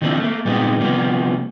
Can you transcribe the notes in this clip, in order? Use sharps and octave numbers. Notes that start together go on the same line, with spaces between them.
D#3 F3 A#3 C4 D4 E4
A3 A#3
A#2 G3 G#3 B3 C4 D#4
C3 F3 G3 A#3 B3